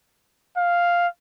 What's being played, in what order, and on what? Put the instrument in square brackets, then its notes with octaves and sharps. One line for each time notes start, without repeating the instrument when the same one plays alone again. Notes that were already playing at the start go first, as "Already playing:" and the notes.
[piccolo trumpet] F5